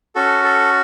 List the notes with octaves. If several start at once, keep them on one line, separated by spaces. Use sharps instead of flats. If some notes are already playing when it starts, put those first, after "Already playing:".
C#4 F#4 A4
A4